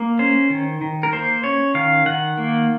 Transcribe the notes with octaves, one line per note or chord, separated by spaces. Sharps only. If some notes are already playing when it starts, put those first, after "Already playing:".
Already playing: A#3
C#4 C5
D#3
D#3
A#4
A#3 C5
C#4 C#5
D#3 F5
D#3 F#5
A#3